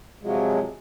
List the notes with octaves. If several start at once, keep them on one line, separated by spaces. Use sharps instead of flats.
C3 F3 F#3 G#3